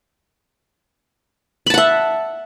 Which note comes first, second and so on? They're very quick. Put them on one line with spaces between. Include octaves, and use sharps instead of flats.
B5 A5 F#5 E5